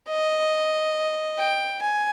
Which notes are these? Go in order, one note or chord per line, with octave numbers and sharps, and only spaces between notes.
D#5
G5
G#5